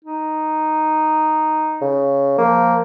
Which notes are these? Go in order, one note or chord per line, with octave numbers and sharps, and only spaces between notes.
D#4
C#3
F3 A#3